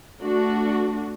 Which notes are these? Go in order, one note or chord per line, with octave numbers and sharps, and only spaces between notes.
A3 D4 F#4